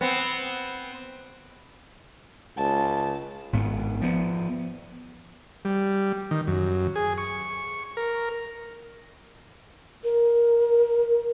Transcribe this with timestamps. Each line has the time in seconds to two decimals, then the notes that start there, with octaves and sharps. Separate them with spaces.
0.01 B3 C4
2.57 C#2 A5
3.53 G#1 G#2 B3
4.01 F3 B3
5.65 G3
6.31 D#3
6.47 F#2
6.96 G#4
7.18 C#6
7.97 A#4
10.04 A#4